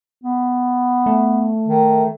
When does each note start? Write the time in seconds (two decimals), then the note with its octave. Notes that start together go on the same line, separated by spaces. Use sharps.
0.24 B3
1.06 A3
1.68 D#3